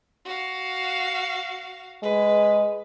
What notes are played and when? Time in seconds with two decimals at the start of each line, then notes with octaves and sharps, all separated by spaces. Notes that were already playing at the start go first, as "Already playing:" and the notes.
0.25 F#4 F5
2.03 G#3 B4